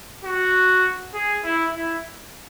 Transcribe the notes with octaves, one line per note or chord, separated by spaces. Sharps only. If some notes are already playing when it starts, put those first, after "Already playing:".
F#4
G#4
E4
E4